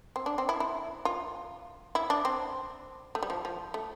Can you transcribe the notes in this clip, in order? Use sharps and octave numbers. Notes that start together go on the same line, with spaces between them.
C4
D4
C4
E4
E4
F4
E4
D4
C4
A3
G3
F3
F3
A3